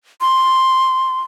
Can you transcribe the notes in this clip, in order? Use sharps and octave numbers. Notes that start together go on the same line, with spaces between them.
C6